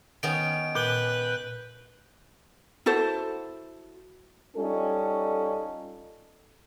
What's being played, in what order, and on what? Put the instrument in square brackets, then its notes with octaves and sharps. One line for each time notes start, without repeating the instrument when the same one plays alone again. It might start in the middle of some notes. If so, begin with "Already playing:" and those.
[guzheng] D#3 B3 C#4 [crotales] D7
[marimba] A#2 [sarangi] B4 [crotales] G6 G7
[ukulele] E4 F#4 A4 C5
[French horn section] G3 C#4 D#4 F4 A4